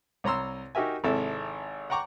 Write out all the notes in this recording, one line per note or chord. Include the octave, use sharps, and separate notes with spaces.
C2 C#5 A#5 C6 E6
D#4 F#4 G4 A#4 E5 G#5
G#1 C3 E4 A4
F#5 G5 A#5 C#6 D6